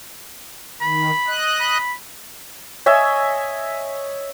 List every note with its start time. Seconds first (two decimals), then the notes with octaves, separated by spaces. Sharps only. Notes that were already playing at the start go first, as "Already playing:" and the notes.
0.81 D#3 B5
1.27 D#5 F#6
1.60 B5
2.86 C#5 D#5 E5 G#5